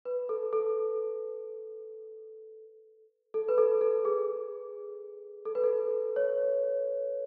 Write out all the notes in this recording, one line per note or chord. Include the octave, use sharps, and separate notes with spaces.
B4
A4
A4
A4
B4
A4
A4
G#4
A4
B4
A4
C#5